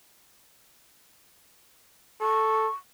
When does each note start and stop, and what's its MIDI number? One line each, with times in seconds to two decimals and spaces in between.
2.21 2.68 69
2.21 2.73 85